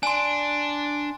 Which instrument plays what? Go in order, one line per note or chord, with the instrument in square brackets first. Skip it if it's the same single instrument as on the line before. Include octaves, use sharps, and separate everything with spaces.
[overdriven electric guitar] D4 [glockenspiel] G#5 C6